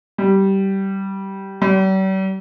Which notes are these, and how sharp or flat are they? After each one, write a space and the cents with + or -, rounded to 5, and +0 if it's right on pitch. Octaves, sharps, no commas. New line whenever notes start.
G3 -15
G3 -45